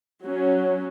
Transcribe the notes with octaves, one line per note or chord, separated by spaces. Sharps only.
F#3 C#4